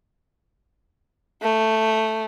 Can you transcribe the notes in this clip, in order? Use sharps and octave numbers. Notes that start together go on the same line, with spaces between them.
A3